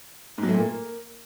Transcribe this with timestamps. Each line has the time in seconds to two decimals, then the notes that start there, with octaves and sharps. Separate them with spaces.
0.38 G#2
0.43 F#3
0.48 A3
0.54 A#2
0.59 A#3